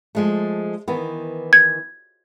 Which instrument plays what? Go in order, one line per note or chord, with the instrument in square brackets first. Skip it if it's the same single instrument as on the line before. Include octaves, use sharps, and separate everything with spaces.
[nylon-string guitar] F3 G#3 A3
D#3 E3 B3
[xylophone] G#6